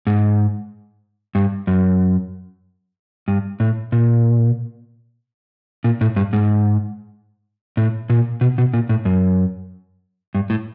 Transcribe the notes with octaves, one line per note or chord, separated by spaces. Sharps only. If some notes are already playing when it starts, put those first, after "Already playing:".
G#2
G2
F#2
G2
A2
A#2
A#2
A2
G2
G#2
A2
A#2
B2
B2
A#2
A2
F#2
G2
A2